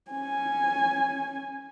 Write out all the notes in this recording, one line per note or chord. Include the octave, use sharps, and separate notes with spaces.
C#4 G#5